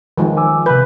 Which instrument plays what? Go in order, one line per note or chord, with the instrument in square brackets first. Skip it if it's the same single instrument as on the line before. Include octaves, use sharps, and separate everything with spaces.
[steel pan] D#3 F3 G#3
[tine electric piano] G#5 D6 E6
[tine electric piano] C3 G6 [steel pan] B4